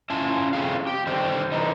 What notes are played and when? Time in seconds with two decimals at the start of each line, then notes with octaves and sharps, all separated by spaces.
0.10 C#4 E4 F4 A5
0.53 A3 C4 G#4 F5
0.87 G4
1.07 D3 D#3 G3 C4 G4 C5
1.52 D3 E3 D#4